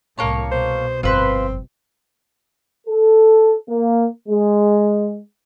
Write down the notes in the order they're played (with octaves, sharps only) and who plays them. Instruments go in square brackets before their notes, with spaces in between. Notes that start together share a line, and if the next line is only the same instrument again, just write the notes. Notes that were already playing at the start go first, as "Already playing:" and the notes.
[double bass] C2 A2 [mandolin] A#3 C#5 A5
[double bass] B2 [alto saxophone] C5
[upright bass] G1 F2 [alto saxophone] C4 [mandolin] F4 B4 C5
[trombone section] A4
A#3
G#3